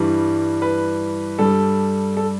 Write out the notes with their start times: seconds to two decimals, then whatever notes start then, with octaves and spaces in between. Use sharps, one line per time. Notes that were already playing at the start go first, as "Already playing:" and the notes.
Already playing: G2 E3 G3
0.62 B4
1.39 G2 G3 A4
2.17 A4